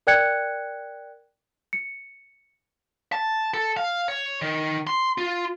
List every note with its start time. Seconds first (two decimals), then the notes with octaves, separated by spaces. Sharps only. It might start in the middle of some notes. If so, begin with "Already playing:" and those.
0.07 A#4 D5 G5 F#6 G#6 C#7
1.73 C#7
3.12 A5
3.54 A4
3.77 F5
4.08 C#5
4.42 D#3
4.87 C6
5.18 F4